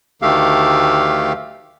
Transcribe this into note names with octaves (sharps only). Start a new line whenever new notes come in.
D2 D#3 A3 G4 A4 F5